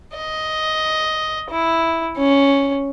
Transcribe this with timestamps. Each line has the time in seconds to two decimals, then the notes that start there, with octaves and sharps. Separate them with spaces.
0.16 D#5
1.50 E4
2.17 C#4